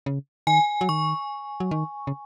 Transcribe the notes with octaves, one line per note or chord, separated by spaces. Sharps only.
C#3
D#3 G#5
F#3
D#3 C#6
F#3
D#3
C#3